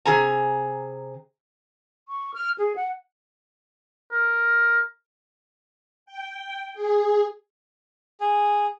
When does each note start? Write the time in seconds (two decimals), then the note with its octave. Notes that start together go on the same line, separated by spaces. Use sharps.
0.05 C3 G#4 G#5 A#5
2.08 C#6
2.34 F6
2.58 G#4
2.76 F#5
4.12 A#4
6.06 G5
6.74 G#4
8.21 G#4